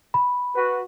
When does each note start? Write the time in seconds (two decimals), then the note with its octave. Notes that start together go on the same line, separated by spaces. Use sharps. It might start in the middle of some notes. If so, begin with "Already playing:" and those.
0.14 B5
0.56 F#4 B4